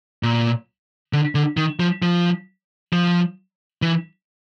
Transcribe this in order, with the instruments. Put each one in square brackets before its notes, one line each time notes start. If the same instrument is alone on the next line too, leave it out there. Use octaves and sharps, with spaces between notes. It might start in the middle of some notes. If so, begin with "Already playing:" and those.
[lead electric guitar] A#2
D3
D3
D#3
F3
F3
F3
E3